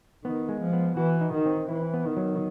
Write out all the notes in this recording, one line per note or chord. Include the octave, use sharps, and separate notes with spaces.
D#3 B3
G#3
F3
B3
E3 F#4
D#4
D#3
C4
E3 E4
B3
D#3
F#3